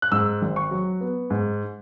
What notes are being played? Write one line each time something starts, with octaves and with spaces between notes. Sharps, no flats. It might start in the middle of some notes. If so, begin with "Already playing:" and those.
F#6
G#2 E6
G#1
C#6
F#3
B3
G#2